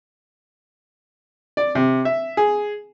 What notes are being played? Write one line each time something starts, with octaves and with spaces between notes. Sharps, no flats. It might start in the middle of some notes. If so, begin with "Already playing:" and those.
D5
C3
E5
G#4